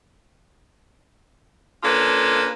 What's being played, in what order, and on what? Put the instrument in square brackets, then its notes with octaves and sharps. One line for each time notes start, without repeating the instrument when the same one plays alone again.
[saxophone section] A#3 C#4 D4 F4 A4 B4